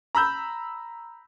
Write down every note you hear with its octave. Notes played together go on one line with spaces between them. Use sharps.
A#5 B5 E6 G6